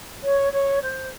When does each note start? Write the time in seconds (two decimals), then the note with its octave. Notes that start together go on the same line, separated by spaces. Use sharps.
0.23 C#5
0.53 C#5
0.82 C5